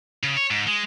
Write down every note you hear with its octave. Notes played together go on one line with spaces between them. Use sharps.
C#3
C#5
G#2
G#3